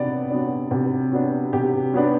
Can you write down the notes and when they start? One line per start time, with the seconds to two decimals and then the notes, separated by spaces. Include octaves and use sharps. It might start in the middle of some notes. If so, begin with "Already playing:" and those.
Already playing: C3 F#3 B3 D4 D5
0.30 F#3 B3 D4
0.71 C3
1.12 F#3 B3 D4
1.53 C3 G4
1.94 F#3 B3 D4